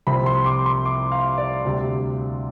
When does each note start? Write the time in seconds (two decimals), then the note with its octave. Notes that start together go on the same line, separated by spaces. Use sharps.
0.07 C2 C3 F3 C4 B5
0.26 C6
0.46 D6
0.66 C6
0.85 D6
1.12 F5
1.38 D5
1.65 D2 C3 G3